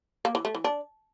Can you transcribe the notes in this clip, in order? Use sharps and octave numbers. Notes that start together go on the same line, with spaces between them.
A#3
E3
A3
E3
D4